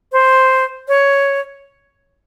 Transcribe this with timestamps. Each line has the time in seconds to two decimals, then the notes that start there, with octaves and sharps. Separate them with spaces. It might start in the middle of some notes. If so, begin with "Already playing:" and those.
0.12 C5
0.88 C#5